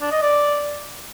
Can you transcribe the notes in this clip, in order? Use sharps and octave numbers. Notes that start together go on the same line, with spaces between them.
D4
D#5
D5